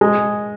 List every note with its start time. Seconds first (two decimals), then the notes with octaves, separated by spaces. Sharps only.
0.01 G#3